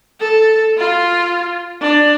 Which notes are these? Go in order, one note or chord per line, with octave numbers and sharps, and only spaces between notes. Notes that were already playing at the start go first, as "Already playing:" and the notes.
A4
F4
D4